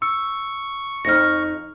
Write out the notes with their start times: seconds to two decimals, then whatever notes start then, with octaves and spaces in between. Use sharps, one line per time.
0.02 C#6 E6 C#7
1.05 F2 D#4 F6 A#6 C#7